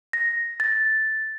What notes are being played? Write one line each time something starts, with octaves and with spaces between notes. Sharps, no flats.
A#6
A6